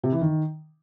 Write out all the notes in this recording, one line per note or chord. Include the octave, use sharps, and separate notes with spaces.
C3
E3
D#3